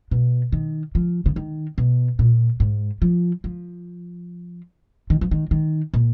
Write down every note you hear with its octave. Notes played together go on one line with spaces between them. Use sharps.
B2
D#3
F3
C#3
D#3
B2
A#2
G#2
F3
F3
D#3
F3
D#3
D#3
A#2